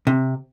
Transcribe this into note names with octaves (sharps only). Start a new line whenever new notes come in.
C3